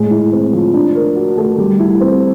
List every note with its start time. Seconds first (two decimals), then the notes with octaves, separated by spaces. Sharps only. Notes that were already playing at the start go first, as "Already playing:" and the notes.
Already playing: A2 G#3
0.11 E4
0.32 C4
0.53 F3
0.74 D4
0.95 A#4
1.16 F#4
1.37 A3
1.58 G3
1.80 E4
2.01 C4